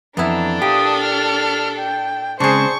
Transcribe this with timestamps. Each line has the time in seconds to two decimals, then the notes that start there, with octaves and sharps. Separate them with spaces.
0.17 F2 E3 B3 D4 E4 A4 A#5
0.62 A#2 G4 D#6
1.03 F6
1.79 G5
2.40 C#3 G#3 C4 D4 G#4 C5 C#6